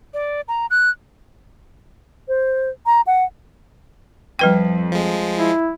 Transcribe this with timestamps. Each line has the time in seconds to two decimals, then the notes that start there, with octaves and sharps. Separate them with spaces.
0.14 D5
0.48 A#5
0.71 F#6
2.28 C5
2.86 A#5
3.07 F#5
4.39 F2 G3 B4 G5
4.92 F3 G#3
5.38 E4